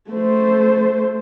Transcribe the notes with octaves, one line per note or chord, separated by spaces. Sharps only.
A3 C5